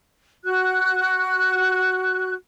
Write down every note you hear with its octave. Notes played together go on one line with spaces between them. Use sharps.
F#4 F#6